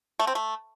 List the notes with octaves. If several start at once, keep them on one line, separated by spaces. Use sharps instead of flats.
A3
C4
A3